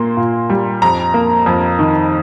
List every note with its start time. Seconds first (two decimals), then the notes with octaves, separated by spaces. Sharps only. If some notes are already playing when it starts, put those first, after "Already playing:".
Already playing: A#2 A#3 C6
0.17 A#2
0.50 G3
0.82 F2 A#5
1.14 A#3
1.46 F2
1.79 D#3